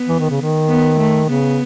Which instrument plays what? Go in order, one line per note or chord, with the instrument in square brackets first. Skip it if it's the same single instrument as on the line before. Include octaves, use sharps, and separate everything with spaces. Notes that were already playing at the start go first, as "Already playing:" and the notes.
Already playing: [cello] B3
[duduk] E3
D#3
C#3
D#3
[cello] B3
A3
[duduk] C#3 [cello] B3